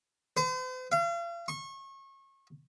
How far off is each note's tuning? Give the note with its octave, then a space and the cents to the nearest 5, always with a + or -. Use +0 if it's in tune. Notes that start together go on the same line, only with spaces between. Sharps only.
C5 -45
F5 -40
C#6 -30